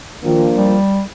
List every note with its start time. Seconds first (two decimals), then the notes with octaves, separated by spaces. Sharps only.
0.24 D#3 F3 A#3 D4 F4
0.56 G3